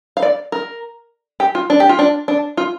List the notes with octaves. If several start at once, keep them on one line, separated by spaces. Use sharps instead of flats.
F5
D5
A#4
G4
F4
D4
G4
F4
D4
D4
F4